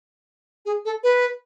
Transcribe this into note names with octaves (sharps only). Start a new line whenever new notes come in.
G#4
A4
B4